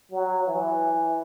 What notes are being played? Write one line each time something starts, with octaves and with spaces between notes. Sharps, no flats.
F#3
E3